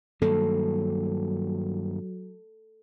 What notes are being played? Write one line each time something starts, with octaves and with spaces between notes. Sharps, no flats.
G2 D#3 F#3 A#3 A4